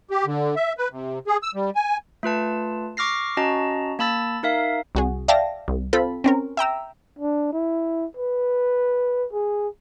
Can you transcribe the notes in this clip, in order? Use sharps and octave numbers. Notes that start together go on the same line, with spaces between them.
G4
D3
E5
B4
C3
G#4
E6
G3
G#5
A3 F4 B4 A5
C#6 D6 F6 A#6 C7
C#4 F#4 D#5 A5 A#5
A#3 A5 B5 E6 A6
D#4 A#4 E5 F5
C2 F#4 G#4
D5 E5 F5 G5 A5 A#6
C2
C4 F4 A4 B5
C4 C#4 A#4
E5 G5 A#5 E6
D4
E4
B4
G#4